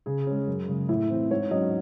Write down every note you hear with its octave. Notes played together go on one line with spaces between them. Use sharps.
C#3 G#4
G#3 C#4
F#2
C#3 G#3
A2 E4
E3 C4
G#2 C#5
F#3 C#4 D#5